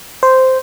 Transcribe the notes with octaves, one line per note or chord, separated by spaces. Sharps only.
C5